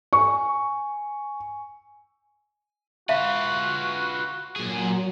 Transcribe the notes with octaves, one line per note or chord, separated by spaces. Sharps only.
G#5 C#6
F4 F#4 B4 E5 F5
A#2 F#3 G#4